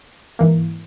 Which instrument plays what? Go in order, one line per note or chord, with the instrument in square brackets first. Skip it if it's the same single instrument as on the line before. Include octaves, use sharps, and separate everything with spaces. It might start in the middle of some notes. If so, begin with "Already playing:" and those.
[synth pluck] G#2 E3 A#3